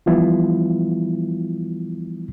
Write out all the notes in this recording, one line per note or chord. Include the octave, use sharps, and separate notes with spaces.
E3 F3 G3 B3 E4 F4